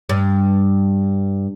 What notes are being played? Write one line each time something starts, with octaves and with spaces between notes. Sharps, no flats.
G2